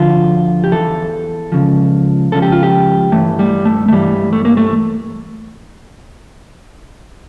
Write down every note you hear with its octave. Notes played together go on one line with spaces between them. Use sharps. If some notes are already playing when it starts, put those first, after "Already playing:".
Already playing: D2 D3 F3 F4
G4
E2 E3 A4
C#2 C#3 F3
C#2 C#3 F3 A4
G4
F4
G4
G2 E3 A3
G3
A3
A3
G2 E3 G3
A3
A#3
A3